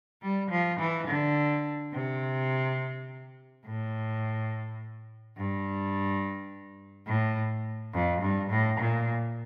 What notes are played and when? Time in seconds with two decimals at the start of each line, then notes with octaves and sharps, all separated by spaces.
0.21 G3
0.50 F3
0.79 E3
1.07 D3
1.93 C3
3.64 A2
5.36 G2
7.08 A2
7.93 F2
8.21 G2
8.50 A2
8.79 A#2